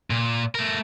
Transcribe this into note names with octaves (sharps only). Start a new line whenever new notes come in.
A#2
A3 A#4